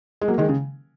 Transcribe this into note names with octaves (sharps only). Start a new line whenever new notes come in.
G#3
F#3 A#3
D#3 G#3
C#3